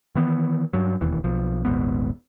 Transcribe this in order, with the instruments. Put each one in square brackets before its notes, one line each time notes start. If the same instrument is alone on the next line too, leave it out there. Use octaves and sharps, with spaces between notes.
[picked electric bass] D#3 E3 B3
G2 F#3
E1 D#2 E3
B1 F3
D#1 G#1 G#2 B3